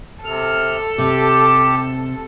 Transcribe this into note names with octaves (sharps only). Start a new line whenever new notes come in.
C3 A4 F6
C3 G4